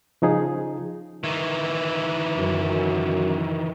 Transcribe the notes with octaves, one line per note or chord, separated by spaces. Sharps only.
C#3 F3 D#4 G#4
D#3 E3
F#2